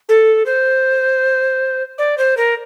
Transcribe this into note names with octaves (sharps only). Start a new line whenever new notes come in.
A4
C5
D5
C5
A#4